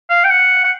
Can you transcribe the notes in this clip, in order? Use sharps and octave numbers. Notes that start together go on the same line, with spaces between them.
F5
G5
F#5
F#5